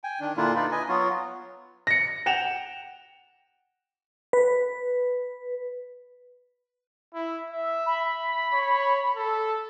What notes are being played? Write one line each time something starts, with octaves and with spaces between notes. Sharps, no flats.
G5 G#5
D#3 D4
A#2 D3 A#3 D4 E4 F4
D#4 F4 B4 D5
B4 D#5 G#5
F#3 B3 F4 F#4
A#6 C#7
F#5 G5 E7 F7
B4
E4
E5
B5
C#5
A4